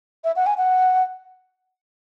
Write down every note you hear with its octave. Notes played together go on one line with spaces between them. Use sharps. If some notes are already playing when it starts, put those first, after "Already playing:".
E5
F#5
G#5
F#5